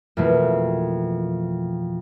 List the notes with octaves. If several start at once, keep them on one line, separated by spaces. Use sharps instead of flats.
F2 B2 E3 A3 A#3 E4